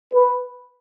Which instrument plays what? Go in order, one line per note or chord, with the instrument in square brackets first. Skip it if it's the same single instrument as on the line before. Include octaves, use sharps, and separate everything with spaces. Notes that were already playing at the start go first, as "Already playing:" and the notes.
[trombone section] B4